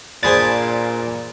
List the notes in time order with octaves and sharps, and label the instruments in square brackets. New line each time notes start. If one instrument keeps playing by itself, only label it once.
[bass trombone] A#2 [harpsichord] D4 G#4 C5 [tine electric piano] G#5 B5 A6